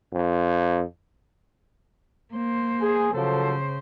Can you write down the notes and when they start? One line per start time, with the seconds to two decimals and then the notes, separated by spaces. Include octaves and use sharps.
0.13 F2
2.33 A#3 C5
2.80 G#4
3.14 C#3 F3 F#3 A4 C5